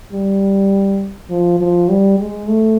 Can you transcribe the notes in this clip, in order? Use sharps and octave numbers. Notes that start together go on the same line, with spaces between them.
G3
F3
F3
G3
G#3
A3